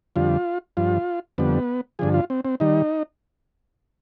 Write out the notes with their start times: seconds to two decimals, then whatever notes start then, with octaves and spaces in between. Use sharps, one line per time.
0.16 F2 D3 G3 F4
0.77 G2 F3 F4
1.38 F2 D3 G3 B3
1.99 G2 D3 F3 G#4
2.14 F4
2.30 C4
2.45 C4
2.60 D#3 G3 D#4